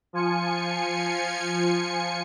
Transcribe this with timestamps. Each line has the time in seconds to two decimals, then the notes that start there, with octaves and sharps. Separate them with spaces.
0.13 F3 F4 G#5 C#7